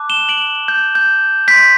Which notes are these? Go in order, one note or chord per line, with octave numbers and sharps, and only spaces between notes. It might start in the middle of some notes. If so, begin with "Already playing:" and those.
Already playing: A5 D6 F#6
E7 G7
D7 F#7
G6
G6
C6 G6 B6